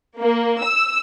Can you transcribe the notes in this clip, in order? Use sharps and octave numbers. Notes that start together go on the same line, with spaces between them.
A#3
E6